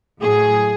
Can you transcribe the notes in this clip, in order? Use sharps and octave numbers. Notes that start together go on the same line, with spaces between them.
A2 F#3 G#4